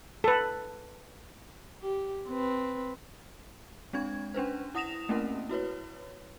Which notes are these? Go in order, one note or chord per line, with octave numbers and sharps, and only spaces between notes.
A4 B4
G4
C4 B4
G#3 C4 D4 G#6
C#4 D4 B4 C5
E4 F#5 D#6 A#6 E7 F7
A3 A#3 C4 C#4 E4 A#4
E4 F#4 B4 C#5